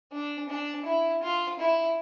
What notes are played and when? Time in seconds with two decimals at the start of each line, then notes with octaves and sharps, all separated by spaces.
0.12 D4
0.49 D4
0.85 E4
1.22 F4
1.59 E4